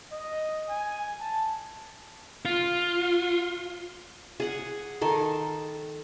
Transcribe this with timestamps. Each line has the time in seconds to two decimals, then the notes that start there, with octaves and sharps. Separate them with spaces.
0.12 D#5
0.69 G#5
1.20 A5
2.45 F4
4.40 G#4 F#5
5.01 D#3 A4 C6